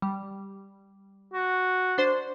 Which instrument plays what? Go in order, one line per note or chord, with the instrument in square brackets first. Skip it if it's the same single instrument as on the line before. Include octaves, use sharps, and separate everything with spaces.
[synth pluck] G3
[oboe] F#4
[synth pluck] D4 C5 C6